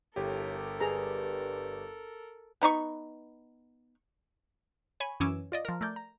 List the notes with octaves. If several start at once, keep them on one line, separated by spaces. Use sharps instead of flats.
G1 A2 G4 A4 A#4
G2 G#4 A#5
B3 D#4 D5 C#6
C#5 G#5 B5
F#2 E3 C#4 G#5 D6 E6
F4 D5 D#5
F3 A#4
A3 A#4 D5 G6
A#5